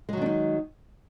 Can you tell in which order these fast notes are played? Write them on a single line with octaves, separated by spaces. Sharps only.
G#3 F#3 D#3 D4 D#4